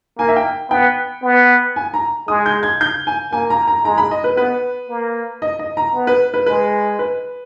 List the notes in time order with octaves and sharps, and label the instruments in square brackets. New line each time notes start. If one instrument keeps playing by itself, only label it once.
[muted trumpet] A#3 [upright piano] G#5
[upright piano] E5
G5
[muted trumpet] B3 [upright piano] G5
[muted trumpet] B3
[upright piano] G#5
A#5
[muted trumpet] G#3 [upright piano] D#6
[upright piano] G6
G#6
G6
G#5
[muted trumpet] A#3 [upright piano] G#5
[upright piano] A#5
A#5
[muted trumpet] G#3 [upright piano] A#5
[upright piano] B5
D#5
B4
[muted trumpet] B3 [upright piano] B4
[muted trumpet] A#3
[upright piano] D#5
D#5
A#5
[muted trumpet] B3
[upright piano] B4
B4
[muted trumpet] G#3 [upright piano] B4
[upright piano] B4